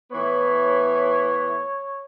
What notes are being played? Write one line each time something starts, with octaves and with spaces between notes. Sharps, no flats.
A2 E3 B3 C#5